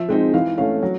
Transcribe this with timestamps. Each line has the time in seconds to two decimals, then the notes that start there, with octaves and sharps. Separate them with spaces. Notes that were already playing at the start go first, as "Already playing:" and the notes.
Already playing: F3 E5
0.09 G#3 C4 D#4
0.34 E3 F5
0.58 A3 C#4 F5
0.83 F#3